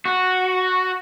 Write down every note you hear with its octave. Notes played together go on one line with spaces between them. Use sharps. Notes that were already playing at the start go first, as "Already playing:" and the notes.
F#4